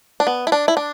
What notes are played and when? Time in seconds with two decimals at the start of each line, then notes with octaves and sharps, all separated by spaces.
0.20 D4
0.27 B3
0.47 E4
0.52 D4
0.68 E4
0.77 D4